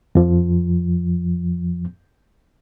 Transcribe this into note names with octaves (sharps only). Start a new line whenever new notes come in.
F2 F3